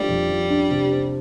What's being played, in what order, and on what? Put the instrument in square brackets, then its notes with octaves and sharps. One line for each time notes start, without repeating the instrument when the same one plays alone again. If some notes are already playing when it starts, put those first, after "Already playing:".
Already playing: [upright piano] F3 A3 D4 [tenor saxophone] G3
[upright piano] F2
F3
D4
C3
C4